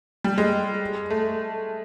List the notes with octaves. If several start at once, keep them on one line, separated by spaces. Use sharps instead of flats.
G3
G#3
A3